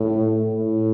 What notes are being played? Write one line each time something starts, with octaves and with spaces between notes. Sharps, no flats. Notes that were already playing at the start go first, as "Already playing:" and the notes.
Already playing: A2
A2